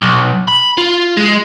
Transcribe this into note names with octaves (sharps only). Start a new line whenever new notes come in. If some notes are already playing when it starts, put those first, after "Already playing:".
B1
B5
F4
G#3